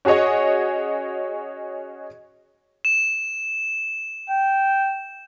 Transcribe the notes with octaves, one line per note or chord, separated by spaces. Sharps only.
C#4 F#4 G#4 C#5 D#5
E7
G5